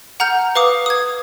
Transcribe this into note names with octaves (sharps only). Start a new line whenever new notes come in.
F#5 A#5 F6 G6
B4 F5 D6 D#6
D#6 G#6